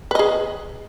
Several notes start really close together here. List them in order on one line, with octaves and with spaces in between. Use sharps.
B4 D#5 G#4